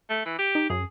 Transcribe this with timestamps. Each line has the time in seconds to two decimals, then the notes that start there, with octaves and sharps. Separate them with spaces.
0.10 A3
0.26 E3
0.39 G4
0.55 D#4
0.70 F#2 G#4